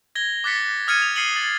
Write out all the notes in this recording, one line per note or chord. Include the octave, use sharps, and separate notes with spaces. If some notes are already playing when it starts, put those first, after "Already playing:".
G#6 A#6 G7
D6 F#6 A6 B6 C#7
D#6 F6 G#6 C#7 D#7
F7
D#6 C7 C#7 D#7 F#7 G7
A6 F#7